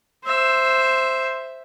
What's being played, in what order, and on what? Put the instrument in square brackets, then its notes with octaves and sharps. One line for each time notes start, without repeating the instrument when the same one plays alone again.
[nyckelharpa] C5 E5